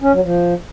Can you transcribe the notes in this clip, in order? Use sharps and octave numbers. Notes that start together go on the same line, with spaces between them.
C#4
F#3
F3